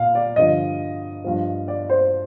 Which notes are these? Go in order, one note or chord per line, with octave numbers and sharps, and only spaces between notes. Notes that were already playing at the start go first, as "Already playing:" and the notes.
Already playing: A#2 F5
D5
G2 D3 F3 D#5
G2 F3
D5
C5